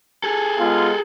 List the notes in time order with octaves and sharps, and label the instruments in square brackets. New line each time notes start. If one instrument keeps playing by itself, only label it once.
[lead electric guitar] G#4 A4
[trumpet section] G#3 B3 F4